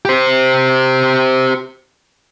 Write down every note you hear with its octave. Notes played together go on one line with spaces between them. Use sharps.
G4 C5